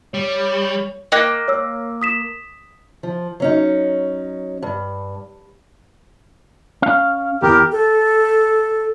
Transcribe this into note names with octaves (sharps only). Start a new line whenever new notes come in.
G3 C#5
A#3 D#5 G5 F#6
C#5 E6
D#6 B6 E7
F3
F#3 C#4 D#4
G2
C#4 F5
E2 E3 G4 A#4
A4